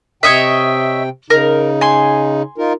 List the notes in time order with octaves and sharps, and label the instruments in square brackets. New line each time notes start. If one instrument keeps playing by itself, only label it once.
[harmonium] C3 G5 [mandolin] C#5 D#5 E5
[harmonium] C#3 D#4 [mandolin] A#4
[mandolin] G#5 C6
[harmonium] D#4 F4 A#4